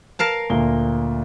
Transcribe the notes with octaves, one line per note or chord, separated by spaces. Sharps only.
A#4 F5 A5
D2 A#2 G7